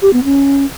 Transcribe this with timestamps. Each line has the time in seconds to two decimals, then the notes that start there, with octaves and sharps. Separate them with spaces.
0.02 G4
0.13 B3
0.24 C#4